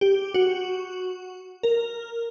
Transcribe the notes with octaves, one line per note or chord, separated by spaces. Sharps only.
G4
F#4
A#4